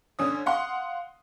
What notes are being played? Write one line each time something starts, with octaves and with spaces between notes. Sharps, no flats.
D3 C#4 D#6
F5 F#5 C6